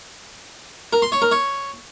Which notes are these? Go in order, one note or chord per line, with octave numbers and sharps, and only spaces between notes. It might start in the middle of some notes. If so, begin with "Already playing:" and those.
A#4
C6
C#5
A#4
C#5